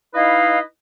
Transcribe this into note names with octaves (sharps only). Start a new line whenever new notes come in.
D#4 E4 B4 D#5 F5